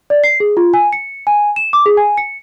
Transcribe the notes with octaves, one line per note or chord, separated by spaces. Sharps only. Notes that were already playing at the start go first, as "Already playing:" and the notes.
D5
C7
G#4
F4
G#5
C#7
G#5
E7
D6
G#4
G#5
C#7